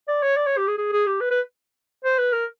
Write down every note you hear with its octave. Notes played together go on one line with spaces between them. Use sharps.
D5
C#5
D5
C#5
G4
G#4
G#4
G#4
G4
B4
B4
C5
B4
A#4